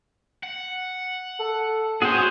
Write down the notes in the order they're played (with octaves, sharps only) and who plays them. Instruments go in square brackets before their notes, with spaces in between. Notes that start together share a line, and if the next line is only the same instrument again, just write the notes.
[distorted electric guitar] F#5
[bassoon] A4
[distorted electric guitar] F#2 C#4 [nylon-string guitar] F#4 F#5 G5 [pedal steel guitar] G#4 C5